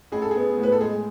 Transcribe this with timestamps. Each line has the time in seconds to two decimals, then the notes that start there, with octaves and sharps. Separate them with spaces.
0.12 A1 G#4
0.22 A4
0.31 B3 G#4
0.58 A2
0.63 B4
0.72 A4
0.81 G#3 G#4